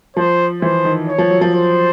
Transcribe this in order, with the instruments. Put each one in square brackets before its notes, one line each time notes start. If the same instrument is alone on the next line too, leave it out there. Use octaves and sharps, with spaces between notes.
[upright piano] F3 [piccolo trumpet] C5
[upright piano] E3 [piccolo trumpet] C5
[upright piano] D#3
[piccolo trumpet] C#5
[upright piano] F3
F#3
F3
[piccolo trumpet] C5